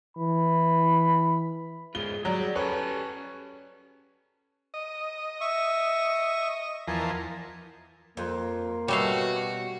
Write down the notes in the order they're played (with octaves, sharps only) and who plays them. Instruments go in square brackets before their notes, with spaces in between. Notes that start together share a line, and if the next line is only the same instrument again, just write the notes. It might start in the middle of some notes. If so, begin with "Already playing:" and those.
[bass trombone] E3 [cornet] B5
[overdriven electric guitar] G#2 F4 [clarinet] G#4 [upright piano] G7
[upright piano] F#3 [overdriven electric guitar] G3 D5 [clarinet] G#4
[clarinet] C#4 [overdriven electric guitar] G4 A4 [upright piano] B4 C#5
[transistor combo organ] D#5
[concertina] E5 C#6
[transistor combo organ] E2 F3 A#4 [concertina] G#5 A5
[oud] F2 [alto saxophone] A#3
[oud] B2 C#4 [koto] G3 A3 F5 [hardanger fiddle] F#4